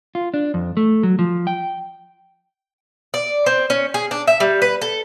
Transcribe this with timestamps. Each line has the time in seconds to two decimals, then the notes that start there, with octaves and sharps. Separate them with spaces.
0.15 F4
0.34 D4
0.54 F2
0.77 A3
1.03 F#3
1.19 F3
1.47 G5
3.14 D5
3.46 C4
3.70 C#4
3.94 G#4
4.11 D4
4.27 E5
4.40 G3
4.62 B4
4.82 A4